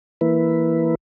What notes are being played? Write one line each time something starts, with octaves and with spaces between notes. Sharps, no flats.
E3 A#3 E4 B4